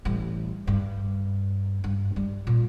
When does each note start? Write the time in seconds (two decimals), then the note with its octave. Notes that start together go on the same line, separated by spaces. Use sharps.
0.05 A1 G3
0.67 G2
1.84 G2
2.16 G3
2.47 A#2